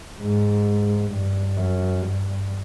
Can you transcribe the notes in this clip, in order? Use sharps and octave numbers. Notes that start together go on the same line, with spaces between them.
G#2
G2
F#2
G2